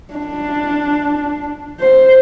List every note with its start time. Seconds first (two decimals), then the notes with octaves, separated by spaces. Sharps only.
0.14 D4
1.81 C5